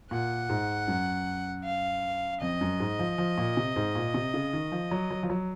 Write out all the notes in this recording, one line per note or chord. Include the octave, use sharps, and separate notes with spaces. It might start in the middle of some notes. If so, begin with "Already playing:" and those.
A#2 F#5
G#2
F#2
F5
F2 D#5
F#2
G#2
F3
F3
A#2
C3
G#2
A#2
C3
C#3
D#3
F3
F#3
F#3
F3
F#3